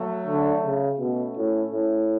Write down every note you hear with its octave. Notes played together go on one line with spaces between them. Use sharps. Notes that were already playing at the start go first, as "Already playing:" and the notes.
Already playing: F#3 A3
D3
C#3
B2 A3 C#4
A2
A2